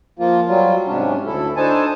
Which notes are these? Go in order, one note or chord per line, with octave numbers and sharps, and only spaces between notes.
F3 A#3 F4
F#3 G3 F4
G#2 C3 C#4 D4
D2 E4 A4
D4 D#4 A4 C5 G#5 A5